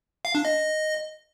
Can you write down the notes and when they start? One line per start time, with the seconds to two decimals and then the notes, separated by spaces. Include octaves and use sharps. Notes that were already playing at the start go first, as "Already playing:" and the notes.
0.25 F5
0.35 D4
0.45 D#5